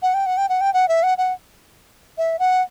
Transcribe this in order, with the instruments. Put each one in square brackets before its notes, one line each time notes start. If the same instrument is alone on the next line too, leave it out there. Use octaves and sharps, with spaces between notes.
[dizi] F#5
G5
F#5
G5
F#5
G5
F#5
E5
F#5
F#5
E5
F#5